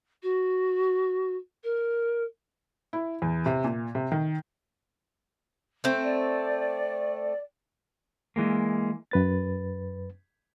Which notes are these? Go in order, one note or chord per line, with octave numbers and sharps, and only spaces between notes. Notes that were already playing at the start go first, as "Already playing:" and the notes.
F#4
A#4
E4
E2
C3
A#2
C3
D#3
A3 C4
D5
E3 G#3 A#3
F#2 B4 A6